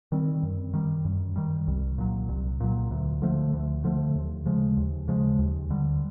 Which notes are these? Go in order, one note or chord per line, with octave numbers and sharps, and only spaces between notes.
D#3 G3 C4
F#2
D#3 G3
F#2
D#3 G3
C2
A#2 F#3
C2
A#2 F#3
D2
D3 F3 A3
D2
D3 F3 A3
D#2
C#3 F3 G#3
D#2
C#3 F3 G#3
D#2
D3 G3